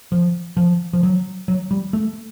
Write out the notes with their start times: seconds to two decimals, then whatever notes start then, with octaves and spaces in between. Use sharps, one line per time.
0.12 F3
0.57 F3
0.93 F3
1.03 F#3
1.48 F#3
1.71 G3
1.93 A3